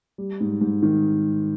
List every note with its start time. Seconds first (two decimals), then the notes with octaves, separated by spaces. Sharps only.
0.18 G3
0.40 G#2
0.61 G#2
0.83 D#3